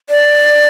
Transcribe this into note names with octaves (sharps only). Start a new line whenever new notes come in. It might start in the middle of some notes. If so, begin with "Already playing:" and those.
D5